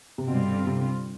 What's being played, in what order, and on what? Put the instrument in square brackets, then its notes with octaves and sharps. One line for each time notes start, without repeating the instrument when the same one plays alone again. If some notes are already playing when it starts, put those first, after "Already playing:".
[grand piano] C3
[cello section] G2 D3 G3 C4 F4 [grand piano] B2
[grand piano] C3